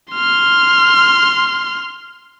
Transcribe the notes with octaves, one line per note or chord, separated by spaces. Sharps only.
C6 F6